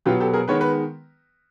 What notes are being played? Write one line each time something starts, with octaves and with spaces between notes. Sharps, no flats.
B2 F#3 B3 F4 G4
G4 A4
G#4 A#4
D#3 G#3 B3 B4 C#5
B4